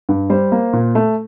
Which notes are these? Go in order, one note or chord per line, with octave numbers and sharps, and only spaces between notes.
G2
G3 C5
A#3
A#2
A3